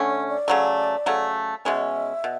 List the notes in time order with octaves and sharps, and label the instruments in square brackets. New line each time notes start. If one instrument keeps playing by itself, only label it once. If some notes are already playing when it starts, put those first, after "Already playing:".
Already playing: [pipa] D3 A3 C#4
[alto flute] C#5
D5
[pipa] C#3 F#3 A3
C#3 F#3 A3
[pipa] B2 G#3 C#4 [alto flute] E5
[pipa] B2